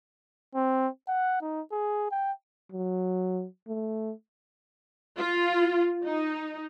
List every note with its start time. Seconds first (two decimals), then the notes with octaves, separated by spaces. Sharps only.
0.55 C4
1.08 F#5
1.42 D#4
1.71 G#4
2.11 G5
2.72 F#3
3.68 A3
5.17 F4
6.04 D#4